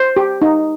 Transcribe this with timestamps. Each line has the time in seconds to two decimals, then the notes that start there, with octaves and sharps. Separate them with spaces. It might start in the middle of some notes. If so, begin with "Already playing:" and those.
Already playing: C5
0.16 G4
0.42 D#4